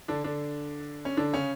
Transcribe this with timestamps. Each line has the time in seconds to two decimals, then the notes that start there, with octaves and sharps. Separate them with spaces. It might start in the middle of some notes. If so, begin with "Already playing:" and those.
0.08 D3 D4
0.24 D3 D4
1.05 C#4
1.17 D3 D4
1.33 C#3 C#4